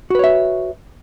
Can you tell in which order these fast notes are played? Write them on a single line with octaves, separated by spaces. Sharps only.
F#4 B4 C#5 E5